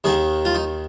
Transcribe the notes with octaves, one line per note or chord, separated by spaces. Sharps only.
D#2 D#3 G#4
F4
D#4